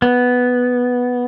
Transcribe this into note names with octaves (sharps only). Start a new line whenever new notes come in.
B3